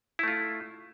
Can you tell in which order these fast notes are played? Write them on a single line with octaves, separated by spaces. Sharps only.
E4 A3 F4